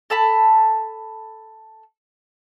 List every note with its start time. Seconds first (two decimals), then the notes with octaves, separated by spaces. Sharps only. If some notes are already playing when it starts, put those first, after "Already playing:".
0.10 A4 A5 B5